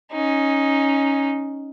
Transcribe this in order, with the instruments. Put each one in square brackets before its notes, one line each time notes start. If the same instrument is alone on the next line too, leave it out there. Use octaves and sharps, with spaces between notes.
[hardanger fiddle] C#4 D#4